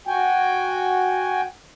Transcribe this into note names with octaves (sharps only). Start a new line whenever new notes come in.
F#4 G5 G#5